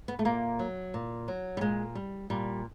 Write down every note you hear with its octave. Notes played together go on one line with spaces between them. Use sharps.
B3
A3
A#2 A#3
F#3
A#2
F#3
G3
A#2 G#3
G3
A#2 G3